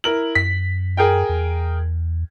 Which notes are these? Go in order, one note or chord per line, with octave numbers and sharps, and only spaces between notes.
E4 A#4 F#7
F#2 B6
G#4 A#4 G5
E2